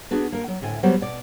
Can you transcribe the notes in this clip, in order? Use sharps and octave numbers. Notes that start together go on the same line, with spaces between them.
B3 D4 F#4 G#4
A#3 A#4
F#3
D2 A2 G#5
F#3 G3 B3 C5 C#5
B2 D5